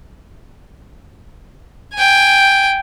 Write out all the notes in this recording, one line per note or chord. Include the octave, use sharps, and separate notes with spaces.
G5 G#5